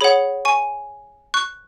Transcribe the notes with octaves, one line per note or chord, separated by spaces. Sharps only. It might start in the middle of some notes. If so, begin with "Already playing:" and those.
G#4 C#5 F#5 B5
G#5 C#6
C#6 F#6